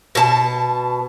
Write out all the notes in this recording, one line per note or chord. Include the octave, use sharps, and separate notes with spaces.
B2 A5